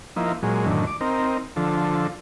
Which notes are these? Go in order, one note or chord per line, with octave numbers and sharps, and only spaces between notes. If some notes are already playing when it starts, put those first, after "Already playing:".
F3 A#3 D#4 E4
A#2 F#3 G#3
F#2 A2 D3 D#3
D6
C4 D#4 A#4
D3 F3 A4